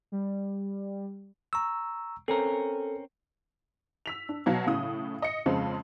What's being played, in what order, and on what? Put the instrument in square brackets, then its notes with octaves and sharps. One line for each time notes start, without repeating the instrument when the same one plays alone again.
[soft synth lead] G3
[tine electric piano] A#5 C#6 E6
[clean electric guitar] C4 C#4 A#4 [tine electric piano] A4
[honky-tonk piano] E6 B6 F7
D4
B2 F#3 F5
A2 C#3 D#6
D#5 C#7
F2 C#3 G#3 C4